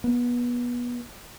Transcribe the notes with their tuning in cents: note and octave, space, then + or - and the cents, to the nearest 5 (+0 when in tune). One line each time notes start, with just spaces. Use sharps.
B3 -25